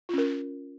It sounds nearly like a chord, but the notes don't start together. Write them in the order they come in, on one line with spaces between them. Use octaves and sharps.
F4 C#4 A#4